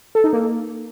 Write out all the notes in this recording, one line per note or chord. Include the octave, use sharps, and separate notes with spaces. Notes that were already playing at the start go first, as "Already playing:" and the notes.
A4
D#4
A#3